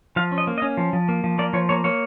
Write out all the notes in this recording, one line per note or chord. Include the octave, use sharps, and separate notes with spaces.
F3 F5
C#4
D#5
A#3
D#5
C#4
F3
F3
A#3
F3
A#3 D5
F3 C#5
A#3 C#5
A#3 C#5